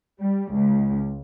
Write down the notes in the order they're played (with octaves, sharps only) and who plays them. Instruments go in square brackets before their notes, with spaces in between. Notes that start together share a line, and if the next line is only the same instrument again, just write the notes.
[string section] G3
C#2